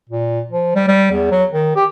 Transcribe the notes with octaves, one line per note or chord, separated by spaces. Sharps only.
A#2
F3
G3
G3
E2
F#3
D#3
G4